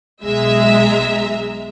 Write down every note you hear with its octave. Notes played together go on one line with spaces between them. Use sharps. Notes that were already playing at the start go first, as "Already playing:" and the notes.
B1 G#3 E5 A#5